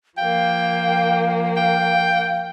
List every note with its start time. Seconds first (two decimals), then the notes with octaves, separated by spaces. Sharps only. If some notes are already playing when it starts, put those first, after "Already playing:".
0.18 F3 A#3 F5 G5
1.57 F5 G5